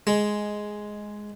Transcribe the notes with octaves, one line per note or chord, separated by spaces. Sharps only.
G#3